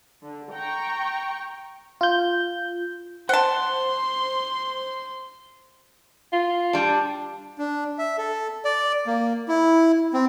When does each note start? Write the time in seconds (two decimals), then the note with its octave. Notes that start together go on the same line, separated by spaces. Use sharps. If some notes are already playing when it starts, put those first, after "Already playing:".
0.23 D3
0.53 G5 A#5 C#6
2.01 F4 G6
3.29 C5 F#5 A5 C6
6.32 F4
6.73 G3 D4
7.58 D4
7.99 E5
8.18 A4
8.65 D5
9.07 A#3
9.49 E4
10.14 C4